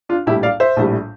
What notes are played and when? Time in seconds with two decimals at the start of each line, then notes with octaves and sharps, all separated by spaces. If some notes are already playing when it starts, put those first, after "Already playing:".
0.09 D4 F4
0.26 A#1 A2 G3 E4 G4
0.43 D5 F5
0.60 C5 E5
0.76 A#1 A2 G3